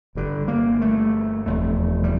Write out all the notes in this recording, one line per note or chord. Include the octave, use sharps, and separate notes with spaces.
G1 G2 D3
A#3
A3
F1 E2 C3 A3
G3